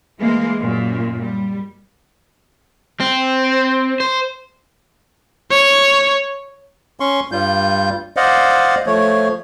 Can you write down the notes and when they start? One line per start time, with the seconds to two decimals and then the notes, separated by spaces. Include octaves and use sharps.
0.20 E3 G#3 A#3
0.61 F#2 A#2
1.21 G3
3.00 C4
4.00 C5
5.51 C#5
7.00 C#4 C6 C#6
7.32 G2 G3 F4 G6
8.17 C5 D5 D#5 F5 F#5
8.86 F3 A3 C#5